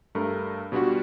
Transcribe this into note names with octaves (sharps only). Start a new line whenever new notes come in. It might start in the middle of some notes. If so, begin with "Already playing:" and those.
G2 A3 A#4
B2 G3 D4 F4 F#4